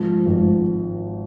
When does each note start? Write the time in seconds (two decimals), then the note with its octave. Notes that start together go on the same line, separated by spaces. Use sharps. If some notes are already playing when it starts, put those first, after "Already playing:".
Already playing: G#1 G#2 F3
0.26 G#1 G#2 F3